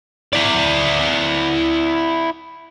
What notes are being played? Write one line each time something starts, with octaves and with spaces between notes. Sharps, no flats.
E4 D5